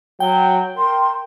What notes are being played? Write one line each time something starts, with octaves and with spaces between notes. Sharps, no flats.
F#3 G5
A#4 C6